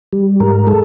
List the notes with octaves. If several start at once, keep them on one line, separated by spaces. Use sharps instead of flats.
G3
G#2 A#4
G#3 A4